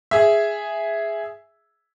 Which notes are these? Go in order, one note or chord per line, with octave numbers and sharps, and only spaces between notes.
G#4 E5